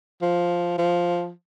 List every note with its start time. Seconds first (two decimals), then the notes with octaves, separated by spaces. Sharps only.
0.22 F3
0.78 F3